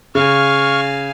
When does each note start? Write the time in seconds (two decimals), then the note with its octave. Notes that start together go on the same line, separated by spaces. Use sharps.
0.15 C#3 F5 G#5 C#6 F6